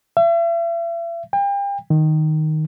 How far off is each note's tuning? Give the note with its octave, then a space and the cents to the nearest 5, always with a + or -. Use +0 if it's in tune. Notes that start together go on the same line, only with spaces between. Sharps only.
E5 +40
G5 +35
D#3 -5